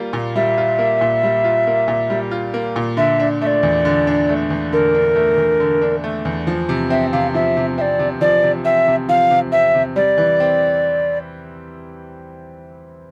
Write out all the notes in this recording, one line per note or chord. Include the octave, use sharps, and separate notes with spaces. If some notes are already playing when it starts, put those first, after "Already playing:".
Already playing: G3 A#3 F4
A#2
G3 E5
F4
A#3
A#2
G3
F4
A#3
A#2
G3
F4
A#3
A#2
D3 E5
D4
A3 E5
D5
E2
D3
D4
A3
E2
D3 A#4
D4
A3
E2
D3
D4
A3
E2
F3
C3
C4 E5
C3 F5
F3 E5
C3
C4 D5 E5
C3
F3 D5
C3
C4 E5
C3
F3 F5
C3
C4 E5
C3
G3 D5
E3
C4